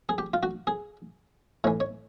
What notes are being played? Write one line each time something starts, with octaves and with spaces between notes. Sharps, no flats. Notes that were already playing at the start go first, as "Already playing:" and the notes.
G#4
G4
F4
F#4
G#4
A2 E3 C#5
C#5